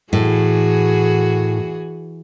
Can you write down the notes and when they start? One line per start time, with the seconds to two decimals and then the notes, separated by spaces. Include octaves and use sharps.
0.13 A2 E3 F#4 G#4